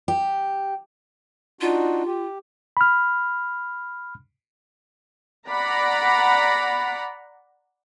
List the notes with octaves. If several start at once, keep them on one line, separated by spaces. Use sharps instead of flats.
G4
D4 D#4 F4 F#4
G4
B5 F6
D5 F#5 A#5 B5